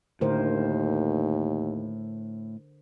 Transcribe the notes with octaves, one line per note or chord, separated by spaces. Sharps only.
D#2 A2 D3 A#4 C5